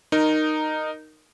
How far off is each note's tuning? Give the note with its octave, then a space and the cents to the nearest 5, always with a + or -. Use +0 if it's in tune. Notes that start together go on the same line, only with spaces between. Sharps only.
D#4 -10 A#4 +0